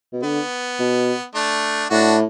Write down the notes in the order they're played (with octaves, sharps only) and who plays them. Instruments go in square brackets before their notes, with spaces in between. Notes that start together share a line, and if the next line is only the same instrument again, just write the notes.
[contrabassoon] B2
[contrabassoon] D3 [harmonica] B3
[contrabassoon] B2
[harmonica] A3 D4
[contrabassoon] A2 [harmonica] D4 F#4